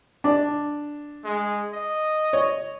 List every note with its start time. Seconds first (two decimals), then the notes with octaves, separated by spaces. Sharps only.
0.24 D4
1.25 G#3
1.73 D#5
2.33 C#5